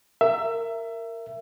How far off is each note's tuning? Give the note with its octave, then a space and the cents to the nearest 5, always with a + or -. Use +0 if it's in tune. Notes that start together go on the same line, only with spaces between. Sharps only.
A#4 -15 E5 +20